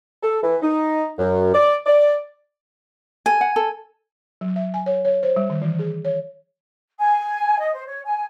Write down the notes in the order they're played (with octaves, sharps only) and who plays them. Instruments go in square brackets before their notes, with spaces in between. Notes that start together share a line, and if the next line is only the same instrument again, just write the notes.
[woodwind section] A4
E3
D#4
F#2
D5
D5
[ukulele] A4 [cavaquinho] G#5
[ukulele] F#5
A4
[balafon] F#3
E5
G#5
C#5
C#5
C5
G3
D#3
E3
G#4
C#5
[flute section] G#5
D#5
C5
C#5
G#5